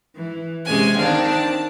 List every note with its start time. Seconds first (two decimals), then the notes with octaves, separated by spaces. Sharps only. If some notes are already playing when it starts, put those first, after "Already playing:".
0.15 E3
0.66 C3 G#3 C#4 G#5
0.98 D#3 C4 D4 F5
1.29 A5